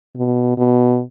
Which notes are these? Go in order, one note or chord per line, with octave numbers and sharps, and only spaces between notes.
B2
B2